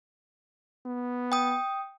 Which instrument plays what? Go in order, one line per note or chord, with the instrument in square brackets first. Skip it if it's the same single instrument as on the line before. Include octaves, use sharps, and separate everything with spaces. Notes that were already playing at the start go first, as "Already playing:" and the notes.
[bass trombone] B3
[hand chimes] G5 D#6